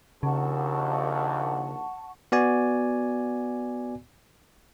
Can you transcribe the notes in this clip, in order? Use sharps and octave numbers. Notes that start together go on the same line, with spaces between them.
A#1 D#2 C#3 F#5 A5 C#6
B3 F#4 D5 G#5